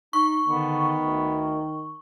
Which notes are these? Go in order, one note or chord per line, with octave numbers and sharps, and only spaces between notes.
D#4 C#6
D3 D#3 B3
D2